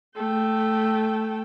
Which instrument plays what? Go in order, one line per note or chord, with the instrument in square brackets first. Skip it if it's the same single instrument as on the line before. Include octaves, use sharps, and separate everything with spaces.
[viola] A3 G5